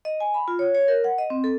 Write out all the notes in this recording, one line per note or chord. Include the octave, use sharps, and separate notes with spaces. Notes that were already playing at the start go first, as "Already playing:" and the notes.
D#5
G#5
B5
F4
C#5
C#5
A#4
F#5
D#5
C4
A4